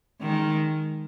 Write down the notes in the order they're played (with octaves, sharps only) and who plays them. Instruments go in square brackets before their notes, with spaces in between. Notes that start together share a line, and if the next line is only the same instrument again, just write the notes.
[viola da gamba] D#3 G#3